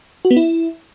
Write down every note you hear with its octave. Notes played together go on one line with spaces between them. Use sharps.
F#4
B3
E4